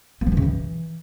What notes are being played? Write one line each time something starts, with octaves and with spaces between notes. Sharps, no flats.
A#3
F3
E3
C#3
E3